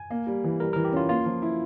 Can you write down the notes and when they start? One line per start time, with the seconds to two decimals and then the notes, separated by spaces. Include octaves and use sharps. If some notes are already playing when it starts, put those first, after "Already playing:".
Already playing: G#5
0.10 A#3
0.27 G3
0.44 E3
0.60 G3 A#4
0.73 E3 A#4
0.85 G4
0.93 C#4 F4
1.09 A#3 F4
1.26 F3
1.42 E4